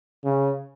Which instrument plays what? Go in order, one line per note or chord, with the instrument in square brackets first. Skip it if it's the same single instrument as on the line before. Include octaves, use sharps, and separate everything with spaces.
[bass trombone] C#3